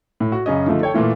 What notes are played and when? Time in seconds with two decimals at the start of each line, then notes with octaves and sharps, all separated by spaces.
0.20 A2
0.32 F#4
0.46 F#2 C#3 C#4 D#5
0.66 D3 F3 A3 D#4
0.81 A4 C#5 G5
0.94 A#2 E3 A3 F4